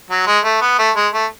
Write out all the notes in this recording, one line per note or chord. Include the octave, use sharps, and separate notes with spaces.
F#3
G#3
A3
B3
A3
G#3
A3